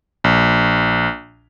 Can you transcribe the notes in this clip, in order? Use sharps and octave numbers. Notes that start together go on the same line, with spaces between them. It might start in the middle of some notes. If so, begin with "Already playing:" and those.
A#1